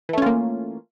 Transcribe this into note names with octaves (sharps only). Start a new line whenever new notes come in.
E3 A3 A#3 C#4 F4